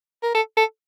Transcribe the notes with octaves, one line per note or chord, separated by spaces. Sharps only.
A#4
A4
A4